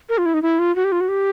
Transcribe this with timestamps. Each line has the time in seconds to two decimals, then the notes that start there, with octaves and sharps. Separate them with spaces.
0.09 A#4
0.18 F4
0.26 E4
0.34 D#4
0.42 E4
0.59 F4
0.76 F#4
0.84 G4
0.92 F4
1.00 F#4
1.08 G4